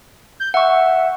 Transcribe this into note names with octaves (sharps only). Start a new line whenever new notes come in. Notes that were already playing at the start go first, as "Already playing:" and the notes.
G6
E5 F#5 C#6